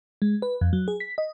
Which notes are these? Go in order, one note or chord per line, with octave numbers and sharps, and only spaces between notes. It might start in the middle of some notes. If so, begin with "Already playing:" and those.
G#3
B4
F2
F#3
G#4
B6
D#5